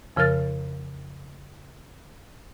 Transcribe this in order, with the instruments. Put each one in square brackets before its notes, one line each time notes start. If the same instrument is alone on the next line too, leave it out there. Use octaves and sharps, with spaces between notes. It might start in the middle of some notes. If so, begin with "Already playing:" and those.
[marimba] F2 C#3 F3 A#4 F6 A6